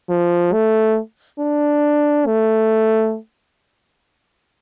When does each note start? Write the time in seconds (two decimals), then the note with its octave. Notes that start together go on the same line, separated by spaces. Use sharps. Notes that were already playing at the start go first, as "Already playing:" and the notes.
0.09 F3
0.53 A3
1.39 D4
2.26 A3